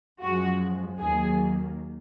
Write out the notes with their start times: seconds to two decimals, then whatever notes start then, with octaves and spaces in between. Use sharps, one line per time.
0.21 F#2 F3 G#3 F#4
1.00 D#2 D#3 F#3 A#3 G#4